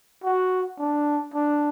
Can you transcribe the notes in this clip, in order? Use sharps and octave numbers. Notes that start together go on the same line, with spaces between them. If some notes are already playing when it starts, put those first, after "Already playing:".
F#4
D4
D4